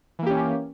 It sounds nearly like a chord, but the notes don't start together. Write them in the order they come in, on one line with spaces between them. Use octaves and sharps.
E3 A#3 G4 C#4